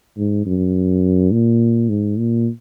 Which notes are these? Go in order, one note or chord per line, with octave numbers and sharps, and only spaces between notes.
G#2
F#2
A#2
G#2
A#2